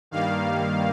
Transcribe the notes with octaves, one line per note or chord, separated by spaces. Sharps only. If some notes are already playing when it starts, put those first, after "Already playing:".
G2 D#3 G3 A#3 F5